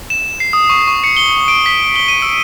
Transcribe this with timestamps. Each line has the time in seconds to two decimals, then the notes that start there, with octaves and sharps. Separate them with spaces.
0.10 E7
0.40 C7
0.53 D#6
0.70 C#6
0.88 C#6
1.04 C#7
1.17 G7
1.48 D7
1.66 B6
1.96 G7
2.08 D#7
2.22 E6